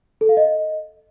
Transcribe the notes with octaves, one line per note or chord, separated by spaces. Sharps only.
A4
F5
D#5